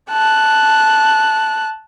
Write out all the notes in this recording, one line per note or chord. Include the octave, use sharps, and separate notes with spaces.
A5 F#6